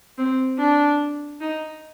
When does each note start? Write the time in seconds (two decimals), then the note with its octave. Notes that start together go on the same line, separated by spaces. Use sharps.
0.18 C4
0.58 D4
1.41 D#4